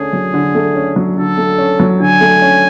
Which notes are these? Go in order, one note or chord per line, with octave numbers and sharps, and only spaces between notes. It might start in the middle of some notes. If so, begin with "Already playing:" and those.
Already playing: D3 A3 C#4 G#4
F#3
D3
A3
C#4
F#3
D3 A4
A3
C#4
F#3
D3 G#5
A3
C#4